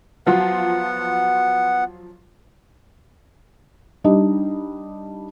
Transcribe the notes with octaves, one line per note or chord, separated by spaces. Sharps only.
F3 F#3 B3 F4 F#5
G3 D4 D#4 D#5